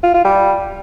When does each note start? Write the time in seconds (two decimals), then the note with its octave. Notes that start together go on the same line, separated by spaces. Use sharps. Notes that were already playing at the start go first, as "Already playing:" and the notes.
0.03 F4
0.14 F4
0.25 G3